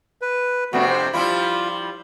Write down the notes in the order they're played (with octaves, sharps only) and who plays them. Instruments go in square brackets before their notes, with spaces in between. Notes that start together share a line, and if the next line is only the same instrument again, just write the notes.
[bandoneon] B4
[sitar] F2 C3 D4 [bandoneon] A3 B3 F#4
[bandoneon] C5
[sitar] F3 G3 E4 [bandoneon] F4